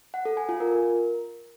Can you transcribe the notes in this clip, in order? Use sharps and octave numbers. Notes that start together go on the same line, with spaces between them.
F#5
A4
G#5
F4
A#4